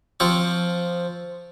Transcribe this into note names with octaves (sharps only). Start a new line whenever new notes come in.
F3 C4 C#6